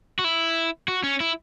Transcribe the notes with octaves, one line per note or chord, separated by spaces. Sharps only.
F#4
E4
F#4
C#4
E4